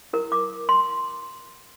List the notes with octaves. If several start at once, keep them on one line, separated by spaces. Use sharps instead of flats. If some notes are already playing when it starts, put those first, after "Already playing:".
E4 A#4
D6
C6